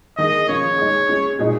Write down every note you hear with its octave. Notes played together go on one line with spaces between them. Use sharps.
D#3 G#3 D#4 G#4 D#5
F3 C#4 F4 C#5
G#3 D#4 G#4
G#3 C#4 G#4
A#2 G#3 D#4 G#4